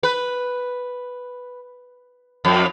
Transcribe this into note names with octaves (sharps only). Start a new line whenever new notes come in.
B4
F2